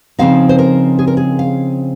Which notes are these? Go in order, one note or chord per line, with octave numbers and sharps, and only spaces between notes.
C#3 F3 C4 D#4 F5
C5
A#4
G#4
A#4
G#4
F5